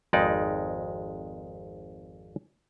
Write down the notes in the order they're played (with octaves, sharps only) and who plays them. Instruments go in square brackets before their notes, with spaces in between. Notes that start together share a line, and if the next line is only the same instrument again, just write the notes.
[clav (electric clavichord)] G#1 F2 G#3 D#4 D5